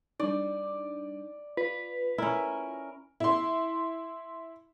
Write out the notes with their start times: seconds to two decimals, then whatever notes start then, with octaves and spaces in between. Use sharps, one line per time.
0.19 G3 D4 D#4 D5
1.57 F4 B4
2.18 C#4 E4 A#4
3.20 E4 C6